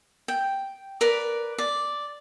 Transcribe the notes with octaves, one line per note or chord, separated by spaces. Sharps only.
G5
A#4 B4 D5 B5
D5